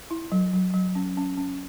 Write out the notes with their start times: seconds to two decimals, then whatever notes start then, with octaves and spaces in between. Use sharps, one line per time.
0.11 E4
0.32 F#3
0.54 F#3
0.74 F#3
0.95 C#4
1.17 C#4
1.37 C#4